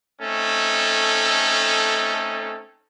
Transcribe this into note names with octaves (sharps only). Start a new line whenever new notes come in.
A3 C4 C#4 D#4 A4